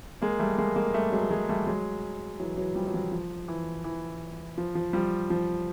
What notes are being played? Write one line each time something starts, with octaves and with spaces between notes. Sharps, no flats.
G#3 A#3
G3 A3
G#3 A#3
G#3 A#3
G3 A3
F#3 G#3
F#3 G#3
G3 A3
F#3 G#3
E3 F#3
E3 F#3
F3 G3
F#3
F3 G3
F3
E3
E3
F3
F3
F3 G3
F3